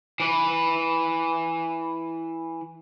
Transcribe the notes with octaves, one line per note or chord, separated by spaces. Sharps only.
E3 B4